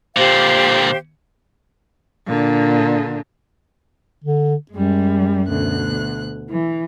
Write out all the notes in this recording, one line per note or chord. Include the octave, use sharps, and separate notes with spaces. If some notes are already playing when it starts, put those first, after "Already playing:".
A#2 D3 G4 C5 F5
A#2 D3
D3
F#2 G3 G#3
D2 B2 F#6
E3